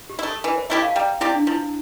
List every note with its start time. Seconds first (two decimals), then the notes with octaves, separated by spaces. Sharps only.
0.09 G4
0.19 E4
0.23 A3 A4
0.44 E3 A#4
0.58 C5
0.70 A3 E4 G4 C5 E5
0.82 F5 A5
0.95 G3 G5 A#5
1.21 C4 E4 G4 D5
1.35 D4
1.47 F3 E4